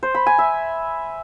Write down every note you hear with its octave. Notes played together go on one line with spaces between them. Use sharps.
C5
B5
G#5
E5